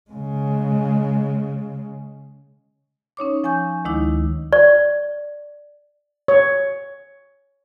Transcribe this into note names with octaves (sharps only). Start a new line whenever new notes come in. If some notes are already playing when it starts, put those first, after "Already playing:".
C#3 G#3
C#4 D#4 C#5 D6
F3 G#5 C#6 G6
D2 D#3 G#3 D#4 E4 D6
D5
C#5